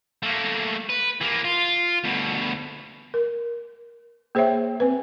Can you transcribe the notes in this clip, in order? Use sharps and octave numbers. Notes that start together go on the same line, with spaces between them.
A3 A#3
B4
E3 A#3
F4
D2 B2
A#4
A#3 G#4 C5 C#5 E5 G5
C4 B4